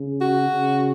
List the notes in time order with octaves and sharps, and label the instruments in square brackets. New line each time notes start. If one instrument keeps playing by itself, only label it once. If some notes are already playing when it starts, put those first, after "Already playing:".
Already playing: [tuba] C#3
[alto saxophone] F#4
[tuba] C#3